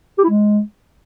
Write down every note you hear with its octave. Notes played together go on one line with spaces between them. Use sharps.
G4
E4
G#3